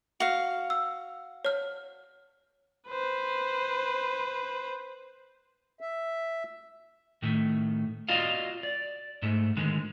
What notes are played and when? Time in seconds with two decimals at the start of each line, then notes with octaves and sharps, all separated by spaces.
0.20 F#4 F5
0.70 E6
1.45 C#5 F6
2.88 B4 C5
5.81 E5
7.22 A2 D#3 A3
8.08 F4 F#4 D5 D#5 F5
8.63 D5
9.22 G#2 A3
9.57 D3 D#3 G#3